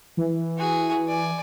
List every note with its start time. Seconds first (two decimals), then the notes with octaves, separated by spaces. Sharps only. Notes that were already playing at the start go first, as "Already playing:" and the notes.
0.17 E3
0.58 F#4 G#4
1.08 D5 G#5